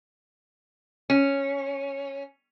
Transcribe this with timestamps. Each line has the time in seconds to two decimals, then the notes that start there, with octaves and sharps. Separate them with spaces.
1.10 C#4